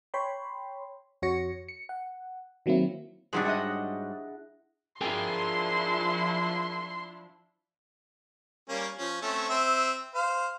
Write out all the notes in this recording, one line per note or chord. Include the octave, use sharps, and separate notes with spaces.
C#5 G5 B5 C6
F2 F#4 C#5 A#6 C#7
C#7
F#5
D#3 F#3 A#3 C4 E4
G#2 F#3 G3 D4 E4 G#4
D#5 E5 F#5
F3 D4 E4 G#4 A#4 G5 C6
G3 A#3 C#4
F3 C#4
A3 C4 C#4
C4 E5
C5 F5